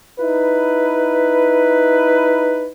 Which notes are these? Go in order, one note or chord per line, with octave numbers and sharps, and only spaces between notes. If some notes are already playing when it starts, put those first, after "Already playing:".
D#4 E4 B4